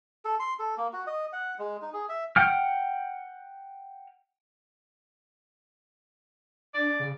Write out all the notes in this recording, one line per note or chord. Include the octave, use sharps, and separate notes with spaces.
A4
C6
A4
A#3
F#4
D#5
F#5
G#3
D#4
G#4
E5
F#5 G5 F6
D4 D5
C#3